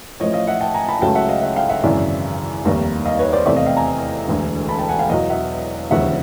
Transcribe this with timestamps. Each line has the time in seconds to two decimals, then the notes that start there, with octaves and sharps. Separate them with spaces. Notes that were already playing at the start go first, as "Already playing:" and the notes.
0.20 A1 A2 F3 C#5 D#5
0.33 D#5 F5
0.47 E5 F#5
0.61 G5 A5
0.74 G#5 A#5
0.88 A5 B5
1.02 C#2 C#3 F#3 A3 G5 A5
1.15 E5 F#5
1.29 D#5 F5
1.42 E5 F#5
1.56 F5 G5
1.69 E5 F#5
1.83 G#1 F#2 C#3 E3 D5 E5
2.65 F1 D#2 D#3 G3 A#3
3.05 D#5 F5
3.19 B4 C#5
3.33 C5 D5
3.46 E2 C3 E3 A3 D5 E5
3.56 D#5 F5
3.67 F5 G5
3.77 G#5 A#5
4.28 E1 D2 D3
4.69 A5 B5
4.79 G5 A5
4.89 F#5 G#5
4.99 F5 G5
5.10 E2 B2 F#3 D#5 F5
5.30 E5 F#5
5.91 E1 D#2 C#3 F3 E5 F#5